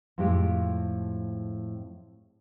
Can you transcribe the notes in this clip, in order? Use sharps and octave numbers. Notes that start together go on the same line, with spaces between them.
F2 A2 G#3 F4 G4